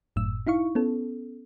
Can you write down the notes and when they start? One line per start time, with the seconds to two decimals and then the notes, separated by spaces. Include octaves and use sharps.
0.16 G1 F#2 A2 E6
0.47 D#4 E4 F5 C#6
0.75 B3 C#4 A4